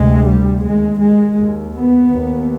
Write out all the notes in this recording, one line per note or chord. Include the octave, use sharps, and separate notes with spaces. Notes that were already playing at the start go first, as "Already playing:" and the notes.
Already playing: D2 C3 G#3
G3
D#2 G#3
G#3
D#2
B3
D#2